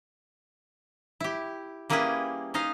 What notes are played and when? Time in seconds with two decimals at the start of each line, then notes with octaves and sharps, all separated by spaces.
1.20 E4 G4
1.90 G3 A#3 C#4 E4 G#4 B4
2.54 C#4 D#4 D#5 F5